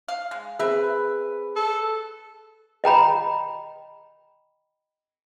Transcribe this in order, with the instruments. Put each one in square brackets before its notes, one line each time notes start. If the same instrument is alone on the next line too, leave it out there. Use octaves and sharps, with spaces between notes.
[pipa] F5
G#3
[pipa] C4 E5 [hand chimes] G#4 [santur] B4
[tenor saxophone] A4
[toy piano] D#5 G5 A#5 B5